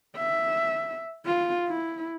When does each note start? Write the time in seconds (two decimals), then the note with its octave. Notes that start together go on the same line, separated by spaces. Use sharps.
0.16 E5
1.26 F4
1.68 E4